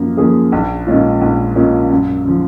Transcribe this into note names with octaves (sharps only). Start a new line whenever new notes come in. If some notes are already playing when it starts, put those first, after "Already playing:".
Already playing: F#2 F3 A#3
F3 A#3 C#4 G#4
A#1
A#2 G#3 C#4 F4
A#1
A#2 G#3 C#4 F4
F#2
C#3 F3